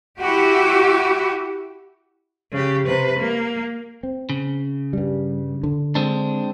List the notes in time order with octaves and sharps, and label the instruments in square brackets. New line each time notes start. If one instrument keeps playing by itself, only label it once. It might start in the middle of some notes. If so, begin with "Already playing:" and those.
[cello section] E4 F#4 G4
[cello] C#3 G4
C3 B4
A#3
[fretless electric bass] C4
[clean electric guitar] C#3
[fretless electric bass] G2 G3
D3
[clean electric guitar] G#3 C4 D4